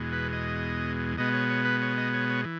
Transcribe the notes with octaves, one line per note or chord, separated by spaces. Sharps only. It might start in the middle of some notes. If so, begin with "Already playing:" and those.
Already playing: E2 B2 G#3
B4
D#5
B2 G#3 B3 D#5
C#5
C#5
B4
C#5
D#5
C#5
C#5
E3